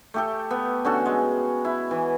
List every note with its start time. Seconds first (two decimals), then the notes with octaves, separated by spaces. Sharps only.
0.14 A3 G4 A4
0.51 B3
0.85 D3 C#4 F#4 A4
1.06 G#3
1.65 E4
1.91 E3